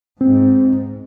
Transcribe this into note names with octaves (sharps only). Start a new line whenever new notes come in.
G#2 C4